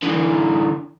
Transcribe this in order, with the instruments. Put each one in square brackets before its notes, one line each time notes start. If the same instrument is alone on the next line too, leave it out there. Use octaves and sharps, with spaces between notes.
[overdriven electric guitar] D3 E3